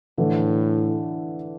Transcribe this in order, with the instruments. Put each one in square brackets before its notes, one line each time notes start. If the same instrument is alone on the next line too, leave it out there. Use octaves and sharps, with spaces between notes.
[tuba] A2 [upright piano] D3 E3